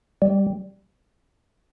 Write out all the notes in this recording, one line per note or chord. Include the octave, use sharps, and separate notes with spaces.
G3